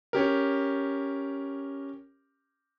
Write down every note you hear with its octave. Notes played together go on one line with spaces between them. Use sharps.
C#4 G4 A#4